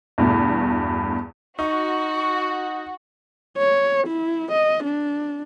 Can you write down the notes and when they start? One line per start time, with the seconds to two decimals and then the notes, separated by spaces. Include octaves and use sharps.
0.18 E2 G2 B2 A3
1.59 D#4 F#4 C#6
3.58 C#5
4.07 E4
4.52 D#5
4.83 D4